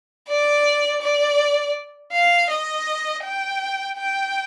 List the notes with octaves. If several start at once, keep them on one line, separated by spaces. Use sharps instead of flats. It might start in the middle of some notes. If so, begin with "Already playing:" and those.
D5
D5
F5
D#5
G5
G5